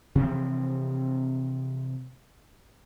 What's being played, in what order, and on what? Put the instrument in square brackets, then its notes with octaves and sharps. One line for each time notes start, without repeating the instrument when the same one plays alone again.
[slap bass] C3 E3 F3 C4